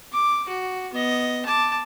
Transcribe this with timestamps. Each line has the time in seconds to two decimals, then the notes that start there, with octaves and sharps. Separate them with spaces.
0.12 D6
0.48 F#4
0.93 B3 D#5
1.45 A5 D6